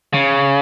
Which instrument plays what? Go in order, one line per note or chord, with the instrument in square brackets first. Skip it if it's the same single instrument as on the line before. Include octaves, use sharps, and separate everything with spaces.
[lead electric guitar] C#3